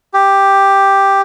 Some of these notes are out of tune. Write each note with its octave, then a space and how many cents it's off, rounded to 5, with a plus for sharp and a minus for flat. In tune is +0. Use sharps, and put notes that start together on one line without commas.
G4 +5